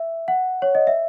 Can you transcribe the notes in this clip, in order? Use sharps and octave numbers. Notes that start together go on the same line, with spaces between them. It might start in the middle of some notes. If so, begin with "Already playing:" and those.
Already playing: E5
F#5
C#5
D#5
E5